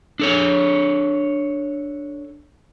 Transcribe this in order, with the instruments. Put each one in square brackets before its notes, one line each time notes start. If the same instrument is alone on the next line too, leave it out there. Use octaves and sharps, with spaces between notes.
[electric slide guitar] D4 A4 C#5